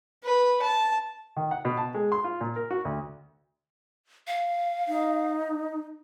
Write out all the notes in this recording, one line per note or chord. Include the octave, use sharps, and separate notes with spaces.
B4
A5
D#3
F#5
B2
A5
G#3
C6
F4
A#2
A#4
F#4
D2
F5
D#4